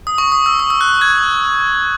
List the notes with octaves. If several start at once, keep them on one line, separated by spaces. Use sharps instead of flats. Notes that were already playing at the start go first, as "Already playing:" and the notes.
D#6
C#6
D#6
E6
D#6
E6
F#6
G#6